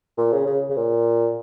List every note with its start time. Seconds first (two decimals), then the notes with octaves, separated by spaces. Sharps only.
0.17 A#2
0.32 C#3
0.46 C#3
0.70 C#3
0.77 A#2